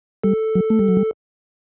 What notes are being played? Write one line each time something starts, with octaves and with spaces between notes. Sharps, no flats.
G3 A4
F#3
A3
G3
F#3
G3